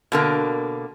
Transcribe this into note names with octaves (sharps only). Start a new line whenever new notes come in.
B2 D3 A#3